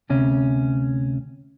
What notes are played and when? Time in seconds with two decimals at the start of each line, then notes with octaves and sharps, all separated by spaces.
0.10 D2 C3 C#4